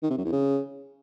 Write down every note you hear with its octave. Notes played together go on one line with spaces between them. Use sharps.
D#3
C3
F#2
E2
C#3